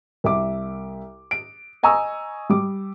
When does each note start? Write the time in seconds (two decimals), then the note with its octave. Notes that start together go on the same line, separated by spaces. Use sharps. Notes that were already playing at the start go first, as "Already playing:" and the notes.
0.24 C2 E5 D6
1.31 D7
1.83 D#5 G#5 A#5 C#6 D#6 E6
2.50 G3 D6